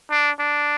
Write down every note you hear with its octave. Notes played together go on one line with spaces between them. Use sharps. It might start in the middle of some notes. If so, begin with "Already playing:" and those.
D4
D4